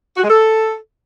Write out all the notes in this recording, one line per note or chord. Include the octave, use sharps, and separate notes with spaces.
F#4
G#3
A4